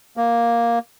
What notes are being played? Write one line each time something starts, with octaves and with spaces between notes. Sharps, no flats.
A#3